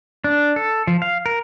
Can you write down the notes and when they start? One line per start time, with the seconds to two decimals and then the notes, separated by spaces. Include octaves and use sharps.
0.24 D4
0.56 A4
0.87 F3
1.02 F5
1.26 A#4